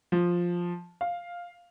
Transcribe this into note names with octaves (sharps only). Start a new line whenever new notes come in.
F3
F5